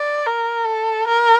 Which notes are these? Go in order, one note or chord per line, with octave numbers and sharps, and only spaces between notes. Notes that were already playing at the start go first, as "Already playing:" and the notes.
Already playing: D5
A#4
A4
A#4